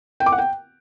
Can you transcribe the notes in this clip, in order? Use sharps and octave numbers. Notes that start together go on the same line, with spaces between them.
G5
D6
F#5
G5